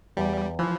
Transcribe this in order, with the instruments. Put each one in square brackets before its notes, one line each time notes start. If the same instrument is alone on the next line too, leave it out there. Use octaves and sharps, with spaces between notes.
[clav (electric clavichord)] E2 [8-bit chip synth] G3
[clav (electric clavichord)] E3 [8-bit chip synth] F3